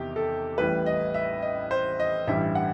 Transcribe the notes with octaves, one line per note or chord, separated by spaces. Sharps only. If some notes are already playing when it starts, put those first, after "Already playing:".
Already playing: E2 C3 D#3 G4
A4
A1 A2 E3 G3 B4
D#5
E5
D#5
C5
D#5
A1 G2 E3 G3 E5
F#5